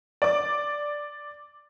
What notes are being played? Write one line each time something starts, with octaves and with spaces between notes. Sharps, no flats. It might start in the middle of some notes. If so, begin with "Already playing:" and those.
D5 D6